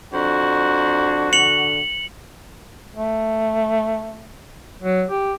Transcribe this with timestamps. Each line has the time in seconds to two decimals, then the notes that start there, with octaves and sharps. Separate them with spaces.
0.14 F2 D4 F#4
1.33 D3 C#7 F7 F#7
2.96 A3
4.82 F#3
5.10 G4